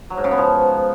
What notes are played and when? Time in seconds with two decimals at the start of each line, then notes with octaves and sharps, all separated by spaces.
0.10 F#3
0.17 G#2
0.24 C#3
0.31 B3
0.38 F3